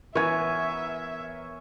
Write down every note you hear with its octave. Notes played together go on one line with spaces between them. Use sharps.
E3 B3 A#4 B4 C#5 E5 G#5